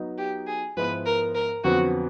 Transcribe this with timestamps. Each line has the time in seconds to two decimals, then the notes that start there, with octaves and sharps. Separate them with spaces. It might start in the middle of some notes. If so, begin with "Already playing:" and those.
Already playing: F#3 B3 D#4 F#4
0.18 G4
0.47 G#4
0.77 G#2 F3 G#3 B3 E4 B4
1.06 A#4
1.35 A#4
1.64 F2 D3 F#3 B3 F#4